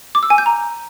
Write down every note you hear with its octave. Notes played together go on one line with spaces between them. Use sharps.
D6
E6
G#5
G6
A#5